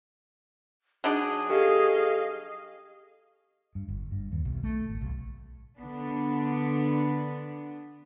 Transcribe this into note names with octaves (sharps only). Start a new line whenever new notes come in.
F#3 D4 D#4 G#4
G4 A4 D#5 F5
G2
G1
G2
D#2
B1
A3
G#1
B1
D3 B3 D4